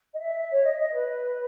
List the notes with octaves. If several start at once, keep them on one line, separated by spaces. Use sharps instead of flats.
D#5
E5
C#5
D#5
D#5
B4